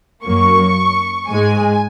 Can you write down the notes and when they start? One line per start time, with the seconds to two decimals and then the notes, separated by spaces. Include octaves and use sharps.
0.25 F#2 F#3 A#3 C#6
1.29 G#2 G#3 G#5